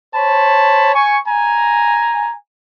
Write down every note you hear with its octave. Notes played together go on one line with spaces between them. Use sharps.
C5 C#5 A5 B5
G#5 C#6
G#5 A#5